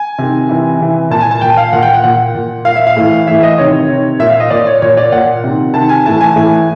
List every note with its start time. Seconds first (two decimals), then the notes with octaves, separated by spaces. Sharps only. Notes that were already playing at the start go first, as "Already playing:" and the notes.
Already playing: G#5
0.18 C3 D#3
0.49 C3 E3
0.81 C3 E3
1.10 A#2 A5
1.21 G#5
1.31 A5
1.41 A#2 G5
1.57 F5
1.73 A#2 F#5
1.82 G5
1.93 F#5
2.04 A#2 F#5
2.35 A#2
2.65 A#2 F5
2.76 E5
2.87 F5
2.97 A2 E3
3.27 A2 E3 E5
3.43 D#5
3.58 C3 D#3 C#5
3.88 C3 D#3
4.19 A#2 E5
4.30 F5
4.40 D#5
4.50 A#2 D5
4.67 C#5
4.82 A#2 C#5
4.97 D5
5.12 A#2 F#5
5.44 C3 D#3
5.74 C3 D#3 A5
5.89 G#5
6.06 A2 E3 A5
6.21 G#5
6.36 A2 E3